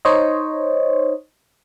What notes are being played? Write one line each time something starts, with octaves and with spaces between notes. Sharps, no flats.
D#4 C5 C#5 D#5